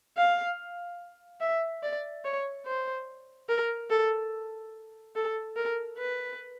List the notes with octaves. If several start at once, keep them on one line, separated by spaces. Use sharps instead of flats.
F5
E5
D5
C#5
C5
A#4
A4
A4
A#4
B4